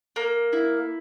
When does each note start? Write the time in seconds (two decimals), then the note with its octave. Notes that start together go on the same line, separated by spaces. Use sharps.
0.16 A#3
0.53 E4